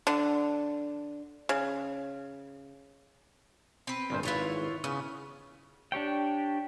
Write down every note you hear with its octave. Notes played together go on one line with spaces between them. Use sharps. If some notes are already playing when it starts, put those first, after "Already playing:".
D3
C#3
C4 B4
G1 A#2 C5
G#1 E4 F4 B4 C#5
C#3 B3
D4 G4 C#5 G5